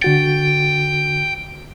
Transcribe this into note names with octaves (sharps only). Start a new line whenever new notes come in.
D3 F#4 G5 A6